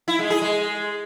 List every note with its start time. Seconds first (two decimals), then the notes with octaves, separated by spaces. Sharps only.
0.08 E4
0.19 G#3
0.30 G#4
0.42 G#3